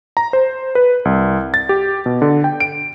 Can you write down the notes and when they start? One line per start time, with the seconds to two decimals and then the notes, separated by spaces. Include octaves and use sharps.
0.17 A#5
0.33 C5
0.75 B4
1.05 C2
1.54 A6
1.69 G4
2.06 B2
2.22 D3
2.44 G5
2.60 D7